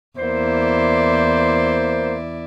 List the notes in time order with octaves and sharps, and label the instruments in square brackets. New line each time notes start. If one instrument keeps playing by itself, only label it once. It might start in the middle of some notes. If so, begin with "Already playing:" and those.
[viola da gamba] E2 E4 D5 [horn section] A#3 C5